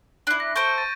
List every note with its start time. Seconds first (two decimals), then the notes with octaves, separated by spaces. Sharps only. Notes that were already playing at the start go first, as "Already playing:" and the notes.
0.27 D4 E4
0.40 A#6
0.56 A4 C5 C#6 G6 D7
0.78 A6 D#7